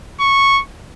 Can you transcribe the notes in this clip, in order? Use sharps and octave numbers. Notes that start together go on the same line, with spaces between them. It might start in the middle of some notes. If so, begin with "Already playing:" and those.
C#6